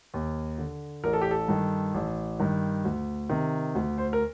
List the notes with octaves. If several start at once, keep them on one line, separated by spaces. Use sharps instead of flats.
D#2
D3
A1 A#4
A4
G4
A4
G2 D#3
A1
G2 D#3
D2
C3 D#3
D2
C5
A#4